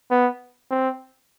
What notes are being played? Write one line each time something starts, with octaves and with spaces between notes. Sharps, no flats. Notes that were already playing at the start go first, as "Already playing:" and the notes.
B3
C4